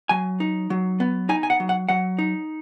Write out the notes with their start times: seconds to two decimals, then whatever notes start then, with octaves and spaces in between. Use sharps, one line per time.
0.09 F#3 G#5
0.40 D#4
0.70 F#3
1.00 B3
1.29 D#4 G#5
1.43 G#5
1.50 F#5
1.60 F#3
1.69 F#5
1.89 F#3 F#5
2.18 D#4